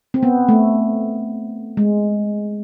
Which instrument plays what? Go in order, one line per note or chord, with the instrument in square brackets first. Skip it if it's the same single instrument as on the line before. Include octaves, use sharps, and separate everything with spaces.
[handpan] C4
B3
A3
G#3